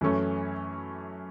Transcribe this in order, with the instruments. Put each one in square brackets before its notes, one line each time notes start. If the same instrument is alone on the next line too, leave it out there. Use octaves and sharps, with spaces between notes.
[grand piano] F#2 E3 A3 C#4